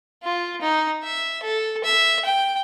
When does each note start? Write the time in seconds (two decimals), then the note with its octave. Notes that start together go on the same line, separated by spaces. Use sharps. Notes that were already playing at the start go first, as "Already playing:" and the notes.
0.23 F4
0.61 D#4
1.04 E5
1.42 A4
1.84 E5
2.25 G5